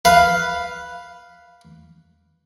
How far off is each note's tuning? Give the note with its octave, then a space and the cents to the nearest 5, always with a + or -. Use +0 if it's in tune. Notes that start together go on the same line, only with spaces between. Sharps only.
B4 +0 F5 +0